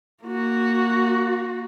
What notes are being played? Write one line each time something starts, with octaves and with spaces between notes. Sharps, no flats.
A#3 F#4